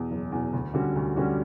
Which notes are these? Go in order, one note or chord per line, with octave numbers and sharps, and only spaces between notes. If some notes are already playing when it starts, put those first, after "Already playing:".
Already playing: E2 B2
F#1
E2 B2
D2
D3 G3 C#4 F#4
D2
D3 G3 C#4 F#4